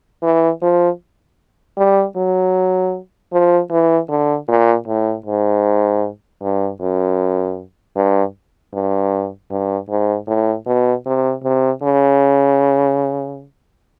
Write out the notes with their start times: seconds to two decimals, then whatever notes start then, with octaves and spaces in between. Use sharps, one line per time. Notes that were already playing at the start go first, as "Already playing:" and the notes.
0.23 E3
0.62 F3
1.77 G3
2.16 F#3
3.33 F3
3.71 E3
4.09 D3
4.48 A#2
4.88 A2
5.26 G#2
6.42 G2
6.81 F#2
7.96 G2
8.74 G2
9.50 G2
9.89 G#2
10.27 A2
10.67 B2
11.06 C3
11.44 C3
11.83 C#3